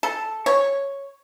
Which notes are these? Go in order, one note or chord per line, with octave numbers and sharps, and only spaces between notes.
A4
C#5